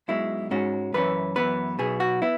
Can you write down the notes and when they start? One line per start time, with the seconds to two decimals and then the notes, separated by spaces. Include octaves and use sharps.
0.08 B1 B2 G#3 E4
0.51 G#2 G#3 C#4 F#4
0.94 F#2 E3 C#4 B4
1.36 F#2 E3 B3 B4
1.79 B1 B2 B3 G#4
2.00 F#4
2.22 B3 E4